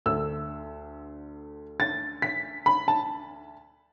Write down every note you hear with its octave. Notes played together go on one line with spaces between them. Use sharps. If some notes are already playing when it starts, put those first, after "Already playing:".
D2 D3 E6
A6
B6
B5
A5